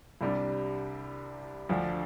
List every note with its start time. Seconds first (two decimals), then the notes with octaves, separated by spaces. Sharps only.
0.21 C2 C3 G3 D4
1.69 D2 D3 F3 D4